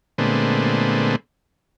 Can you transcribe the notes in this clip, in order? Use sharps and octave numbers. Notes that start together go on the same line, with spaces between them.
A#2 D3 G#3 A3 B3 C4